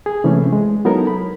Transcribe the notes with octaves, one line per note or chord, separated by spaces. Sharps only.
G#4
C3 E3 G#3 A3 C4 C#4
G#3
F#3 B3 D#4 E4 A4 A#4
B5